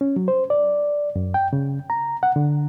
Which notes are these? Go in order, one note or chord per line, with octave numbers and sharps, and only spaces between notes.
C#4
F#3
C5
D5
F#2
G5
C#3
A#5
F#5
D3